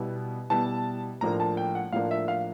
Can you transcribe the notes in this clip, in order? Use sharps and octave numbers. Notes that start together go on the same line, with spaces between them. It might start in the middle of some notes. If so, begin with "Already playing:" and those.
Already playing: B2 G3 B3 E4
B2 G3 B3 E4 A5
A2 F3 A#3 D4 A#5
A5
G5
F#5
A2 F3 A#3 D4 F5
E5
F5